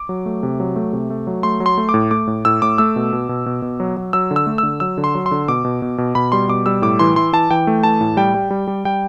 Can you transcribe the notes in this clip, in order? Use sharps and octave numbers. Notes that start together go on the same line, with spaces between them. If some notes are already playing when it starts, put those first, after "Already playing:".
Already playing: D6
F#3
A3
C3
F#3
A3
C3
A3
F#3
A3 C6
F#3
C6
A3
D6
A2
A3 D6
A2
A2 E6
A2 D6
A3 E6
B2
B2
B2
B2
B2
F#3
F#3
F#3 E6
D3
E6
A3
D3 E6
F#3 E6
D3
C6
F#3
C6
D3
B2 D6
B2
B2
B2
B2 B5
G3 C6
B2 D6
G3 E6
A2 D6
E3 C6
E3 C6
E3 A5
E3 G5
A3
E3 A5
A2
G3 G5
G3
G3
G3
G3 G5